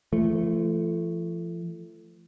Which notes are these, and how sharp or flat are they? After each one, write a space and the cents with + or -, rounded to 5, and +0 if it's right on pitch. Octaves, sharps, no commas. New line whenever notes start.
F3 -40 A3 +0